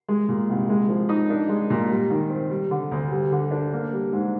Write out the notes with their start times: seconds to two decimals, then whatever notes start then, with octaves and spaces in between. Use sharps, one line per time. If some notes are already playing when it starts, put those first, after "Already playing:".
0.09 G#3
0.29 A#2
0.49 C2
0.69 G#3
0.89 F3
1.09 D#4
1.30 D4
1.49 G#3
1.70 A#2
1.90 G3
2.10 D#3
2.30 C4
2.51 G3
2.71 D3
2.91 D2
3.11 G3
3.32 D3
3.51 D4
3.72 A#3
3.92 G3
4.13 G#2